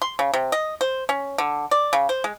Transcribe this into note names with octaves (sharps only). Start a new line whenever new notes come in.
C6
C#3
C3
D#5
C5
C#4
D3
D5
C#3
C5
G#3